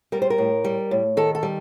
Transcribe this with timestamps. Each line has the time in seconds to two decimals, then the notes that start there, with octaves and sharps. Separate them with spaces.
0.12 G3 A#4
0.22 C5
0.30 A#4
0.38 A2
0.64 G3
0.91 A2
1.17 D#3 A4
1.35 A4
1.43 G3